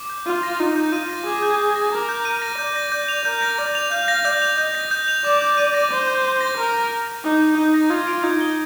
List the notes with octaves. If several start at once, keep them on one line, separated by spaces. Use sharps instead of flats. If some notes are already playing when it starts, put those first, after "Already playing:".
Already playing: D6
G6
F4 D#7
A#6
D#4 D6
G6
F4 D#7
A#6
G#4 D6
G6
D#7
A#6
A#4 D6
G6
D#7
A#6
D5 G6
A#6
G6
F7
A#4 G6
A#6
D5 G6
F7
F5 G6
A#6
D5 G6
F7
D#5 G6
A#6
G6
F7
D5 D6
G6
D#7
A#6
C5 D6
G6
D#7
A#6
A#4 D6
G6
D#7
A#6
D#4 D6
G6
D#4 D#7
A#6
F4 G#6
D7
D#4 G#6
G7